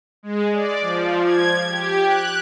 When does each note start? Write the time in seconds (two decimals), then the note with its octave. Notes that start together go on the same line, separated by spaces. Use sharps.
0.23 G#3
0.52 D5
0.81 F3
1.22 G#6
1.68 G4
2.05 F#6